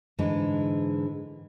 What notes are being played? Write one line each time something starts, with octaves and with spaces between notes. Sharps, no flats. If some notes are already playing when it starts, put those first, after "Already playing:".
G#2 D3 E3 G#3